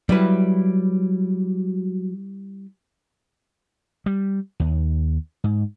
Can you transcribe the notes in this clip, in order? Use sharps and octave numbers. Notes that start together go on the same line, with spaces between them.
F#3 G3 E4 B4
G3
D#2
G#2